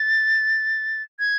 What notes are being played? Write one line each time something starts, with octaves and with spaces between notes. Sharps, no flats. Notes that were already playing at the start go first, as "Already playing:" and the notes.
Already playing: A6
G#6